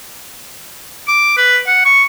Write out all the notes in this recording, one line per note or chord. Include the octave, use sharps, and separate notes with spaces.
D6
B4
F#5
C#6